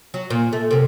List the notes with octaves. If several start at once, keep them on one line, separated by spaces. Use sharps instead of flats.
F#3
A#2
A3
F#2 C3